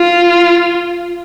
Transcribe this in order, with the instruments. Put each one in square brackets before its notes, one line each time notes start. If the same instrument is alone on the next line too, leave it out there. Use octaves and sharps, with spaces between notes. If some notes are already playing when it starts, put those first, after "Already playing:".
Already playing: [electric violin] F4